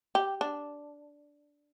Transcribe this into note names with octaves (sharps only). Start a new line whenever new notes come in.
G4
D4